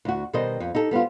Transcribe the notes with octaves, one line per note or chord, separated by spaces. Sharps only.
D2 F#4
B2 D#3 G3 A#4 C5 D#5
F2
D#4 G4 A4
G3 B3 C4 F4